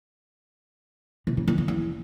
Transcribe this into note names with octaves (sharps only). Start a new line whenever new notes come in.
C3
C#3
D#3
C#3
E2